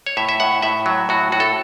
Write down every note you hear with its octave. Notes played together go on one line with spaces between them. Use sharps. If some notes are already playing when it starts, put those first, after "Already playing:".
C#5
A2 E5
E5
A2 F#5
A2 E5
F#3
A2 F#4
A2 F#4
A4